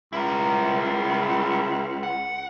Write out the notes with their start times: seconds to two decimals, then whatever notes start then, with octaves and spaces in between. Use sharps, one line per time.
0.13 C#2 E4 A#4
2.03 F#5